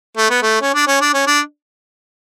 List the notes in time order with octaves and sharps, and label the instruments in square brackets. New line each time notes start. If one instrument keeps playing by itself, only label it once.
[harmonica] A3
B3
A3
C#4
D4
C#4
D4
C#4
D4